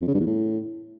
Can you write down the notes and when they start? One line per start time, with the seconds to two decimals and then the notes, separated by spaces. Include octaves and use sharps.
0.01 F2
0.08 C#3
0.14 G2
0.20 E2
0.26 A2